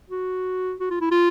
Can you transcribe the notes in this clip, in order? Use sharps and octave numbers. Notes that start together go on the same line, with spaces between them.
F#4
F#4
F4
E4
F4